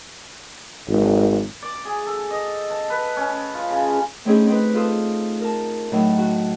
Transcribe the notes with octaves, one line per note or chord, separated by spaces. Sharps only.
G#1
D5
G#4
A4
D#5
A5
B4
C#4
F4
C#3
A3 C4 C#4 D#4 E4 G#4
C4 D#4 B4
F4 A4 C6 D#6
A#4 A5
A2 F#3 D#4 A4
F#4